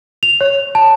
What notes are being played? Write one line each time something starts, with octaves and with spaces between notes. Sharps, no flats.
F7
C#5
A5